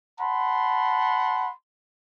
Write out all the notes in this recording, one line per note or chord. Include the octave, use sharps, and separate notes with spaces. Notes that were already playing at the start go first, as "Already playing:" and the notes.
F#5 A5 B5 C6